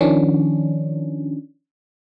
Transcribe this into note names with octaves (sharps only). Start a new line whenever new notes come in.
D#3 F3 C#4 D4